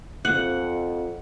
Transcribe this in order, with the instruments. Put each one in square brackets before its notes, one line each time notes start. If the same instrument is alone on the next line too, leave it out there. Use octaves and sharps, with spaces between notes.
[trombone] F2 [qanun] F#5